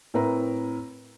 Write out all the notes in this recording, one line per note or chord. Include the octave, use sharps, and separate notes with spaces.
A2 C4 A#4 B4 A#5